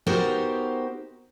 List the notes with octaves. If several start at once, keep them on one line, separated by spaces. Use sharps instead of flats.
B3 D#4 F#4 G4 A#4 C5